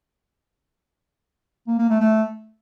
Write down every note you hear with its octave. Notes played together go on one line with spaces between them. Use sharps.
A#3
A#3
A3
A3